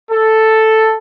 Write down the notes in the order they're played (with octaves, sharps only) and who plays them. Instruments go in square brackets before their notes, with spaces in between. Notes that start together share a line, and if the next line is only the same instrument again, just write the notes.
[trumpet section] A4